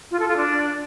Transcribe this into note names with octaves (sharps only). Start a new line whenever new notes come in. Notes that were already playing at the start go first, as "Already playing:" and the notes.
F4
A4
F4
D4